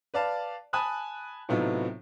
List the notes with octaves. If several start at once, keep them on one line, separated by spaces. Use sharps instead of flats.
B4 D5 F5 A5
G#5 A5 B5 D#6 F#6
A2 C3 F#3 B3 D#4 F4